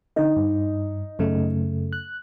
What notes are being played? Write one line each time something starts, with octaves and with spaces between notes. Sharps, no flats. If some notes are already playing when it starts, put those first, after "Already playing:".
D3 D#4 D#5
G2
F#2 C#3 A3
F#6